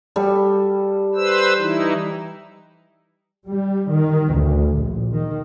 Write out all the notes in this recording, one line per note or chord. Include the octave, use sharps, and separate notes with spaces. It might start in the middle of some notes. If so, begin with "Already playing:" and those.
G3 A4
B4 C5 E6
E3 D#4 E4
G3
D#3
D2
A#1
D#3